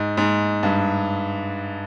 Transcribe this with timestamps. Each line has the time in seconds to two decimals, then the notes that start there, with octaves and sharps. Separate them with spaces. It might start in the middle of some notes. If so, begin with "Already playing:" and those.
Already playing: G#2
0.17 G#2
0.63 G2